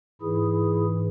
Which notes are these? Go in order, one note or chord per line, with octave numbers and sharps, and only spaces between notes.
G#2 E3 E4 G#4